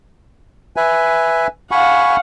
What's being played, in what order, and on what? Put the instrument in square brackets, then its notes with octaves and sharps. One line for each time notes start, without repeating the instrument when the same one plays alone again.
[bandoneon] B4 E5 G#5
[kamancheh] F5 F#5 [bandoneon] G#5 B5 C#6